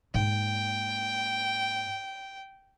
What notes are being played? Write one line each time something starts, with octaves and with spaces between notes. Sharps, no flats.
G#2 A#3 G5